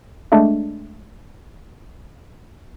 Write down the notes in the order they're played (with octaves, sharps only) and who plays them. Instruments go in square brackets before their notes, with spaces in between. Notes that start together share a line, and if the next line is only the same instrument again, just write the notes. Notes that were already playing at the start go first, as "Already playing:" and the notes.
[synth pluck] G#3 A3 D4